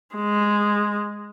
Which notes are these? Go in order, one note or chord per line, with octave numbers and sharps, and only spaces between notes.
G#3